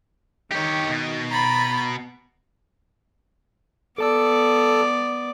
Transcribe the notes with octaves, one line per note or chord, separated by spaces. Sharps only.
D#3 G4 C#5
B2
A#5 B5 A6
B3 A4 D5 A5 E6